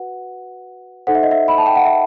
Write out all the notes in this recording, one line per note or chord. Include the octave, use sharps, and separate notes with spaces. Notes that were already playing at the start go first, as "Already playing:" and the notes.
Already playing: F#4 B4 F#5
D#4 A4 C5 F#5
E5
D#5
E5
B5
A5
G5
F#5
E5